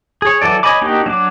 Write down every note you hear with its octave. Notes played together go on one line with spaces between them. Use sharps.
G#4 C#5
E3 F#3 A4 D5
C#5 D#5 G#5 B5 D6
A#3 D4 D#4 F#4 G4
F#3 D4 D6